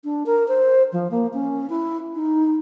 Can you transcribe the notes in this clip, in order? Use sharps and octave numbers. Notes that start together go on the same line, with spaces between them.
D4
A#4
C5
F3
A#3
C#4
E4
D#4